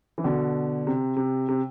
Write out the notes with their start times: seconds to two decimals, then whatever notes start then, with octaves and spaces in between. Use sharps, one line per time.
0.18 E3
0.24 B2 D3
0.87 C3
1.16 C3
1.48 C3